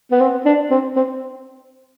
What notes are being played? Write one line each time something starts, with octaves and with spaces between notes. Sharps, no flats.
B3
C4
D4
C4
C4